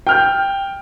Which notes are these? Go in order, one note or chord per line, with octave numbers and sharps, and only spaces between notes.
G5 F6 G6